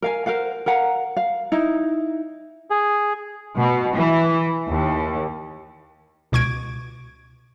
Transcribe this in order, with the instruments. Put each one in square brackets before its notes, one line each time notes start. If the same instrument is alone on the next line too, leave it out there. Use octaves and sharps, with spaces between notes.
[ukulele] A#4 F5 G#5
A#4 C5 F5 F#5
A#4 F5 F#5 A#5
F5
D#4 E4
[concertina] G#4
[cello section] B2
E3
D#2
[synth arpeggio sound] C#2 B2 C#6 G#6 D7